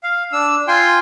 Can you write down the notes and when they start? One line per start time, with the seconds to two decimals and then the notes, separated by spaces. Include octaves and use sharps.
0.03 F5
0.32 D4 E6
0.68 F4 G5 G#5 C6